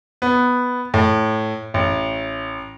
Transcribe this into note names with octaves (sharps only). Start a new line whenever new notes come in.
B3
A2
A1